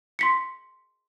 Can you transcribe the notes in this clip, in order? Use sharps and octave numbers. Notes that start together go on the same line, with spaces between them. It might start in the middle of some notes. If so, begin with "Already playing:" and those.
C6 B6 C#7